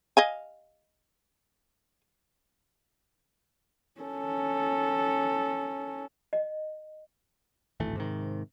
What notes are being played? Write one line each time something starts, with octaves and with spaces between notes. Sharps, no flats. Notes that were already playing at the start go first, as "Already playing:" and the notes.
D#5 F5 G#5
C#4 A4
D#5
D1 G#1 E3 A3
G#2 C3 D#3